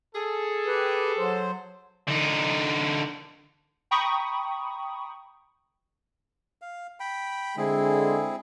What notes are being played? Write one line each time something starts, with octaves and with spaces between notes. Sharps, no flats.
G#4 A4
G4 B4
F#3 C5
D3 D#4
G5 A#5 B5 C#6 D#6
F5
G5 B5
D3 G#3 C4 E4 G#4